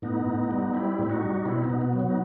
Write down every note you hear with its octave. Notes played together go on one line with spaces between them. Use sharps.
A2 B3 D#4
A2
G3
G3 C4 E4
A2 E4
D#4 F#4
G3
B2 C4 E4
B3 D#4
B2
B3
F#3
B3
D#4